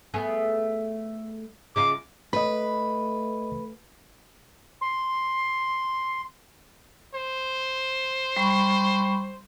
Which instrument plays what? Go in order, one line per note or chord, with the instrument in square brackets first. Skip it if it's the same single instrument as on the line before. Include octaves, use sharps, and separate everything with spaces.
[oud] A3 B3 G#4
[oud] C#3 D#4 F4 [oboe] D6
[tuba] A3 [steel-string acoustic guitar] B4 [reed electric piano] D#5 B5
[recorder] C6
[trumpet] C5
[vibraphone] G3 B5 C#6